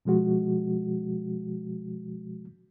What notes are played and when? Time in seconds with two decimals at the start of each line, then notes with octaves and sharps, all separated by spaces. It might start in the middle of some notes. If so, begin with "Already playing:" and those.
0.05 B2 F3 G#3 F#4